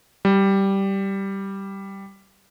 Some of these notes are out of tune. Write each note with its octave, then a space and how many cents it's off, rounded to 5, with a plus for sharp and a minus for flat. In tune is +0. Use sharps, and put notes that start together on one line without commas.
G3 -5